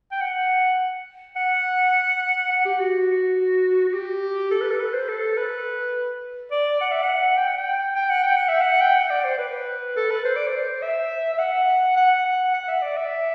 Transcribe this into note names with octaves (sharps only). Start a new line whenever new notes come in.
G5
F#5
F#5
F#5
G4
F#4
F#4
G4
A4
B4
A4
B4
C5
A4
B4
D5
F#5
E5
F#5
G5
F#5
G5
G5
F#5
G5
F#5
E5
F#5
G5
F#5
D5
C5
B4
A4
B4
C5
D5
C5
E5
E5
F#5
F#5
F#5
F#5
E5
D5
E5